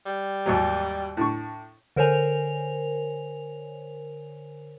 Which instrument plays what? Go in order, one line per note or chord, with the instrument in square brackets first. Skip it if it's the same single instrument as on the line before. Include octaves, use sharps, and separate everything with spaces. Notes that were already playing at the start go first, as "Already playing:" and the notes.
[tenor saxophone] G3
[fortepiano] D#2 G#2 F#3
A2 D4 C#6
[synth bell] D3 A#4 C5 C#5 G#5 F7